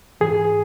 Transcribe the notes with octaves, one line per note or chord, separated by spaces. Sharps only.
G#2 E3 G#4